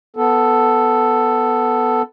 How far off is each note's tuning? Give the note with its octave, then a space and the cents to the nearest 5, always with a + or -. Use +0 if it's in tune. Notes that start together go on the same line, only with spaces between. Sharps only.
B3 +0 A4 +0